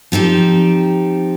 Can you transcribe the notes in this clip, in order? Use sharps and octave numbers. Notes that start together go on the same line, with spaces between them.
F3 C4 D#4 G4